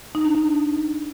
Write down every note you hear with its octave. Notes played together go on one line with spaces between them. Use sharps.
D#4
D4
D#4